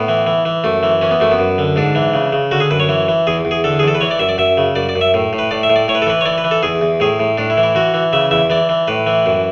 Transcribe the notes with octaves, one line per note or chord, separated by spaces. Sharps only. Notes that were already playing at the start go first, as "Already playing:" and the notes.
Already playing: A2 B3
E3
E3
E3
F#2 A3
E3
E3 C#4
B3
F#2 A3
B3
F#2
D3
G#2 D4
E3
C#3
C#3
D3 F#4
G#4
F#2 B4
C#5
E3
E3
E2 G#4
E2
G#4
D3 A4
G#4
E2 A4
B4
E3 C#5
D5
F#2 E5
D5
F#2 E5
C#3
F#2 D5
D5
F#2
E5
A2
A2
B4
A2 D5
E5
A2
D5
A2 C#5
B4
A4
E3 B4
C#5
E3 D5
B4
E3
A4
E2 G#4
E2
A2 G#4
A2
A2 D4
E4
E3
E4
E3 F#4
E3
C#3 E5
E2 E5
E3 D5
E3
A2 B4
E3
F#2